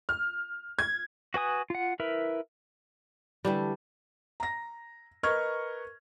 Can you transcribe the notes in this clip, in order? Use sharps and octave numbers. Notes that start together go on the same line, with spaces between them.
F6
G#6
F#4 B4 G#5 D#6
F4 F#5
E4 A#4 B4 E5
D3 E3 G3 A3
A#5 A#6
A#4 B4 D#5 C#6 F6 G#6